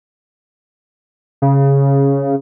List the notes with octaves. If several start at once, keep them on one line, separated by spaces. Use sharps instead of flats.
C#3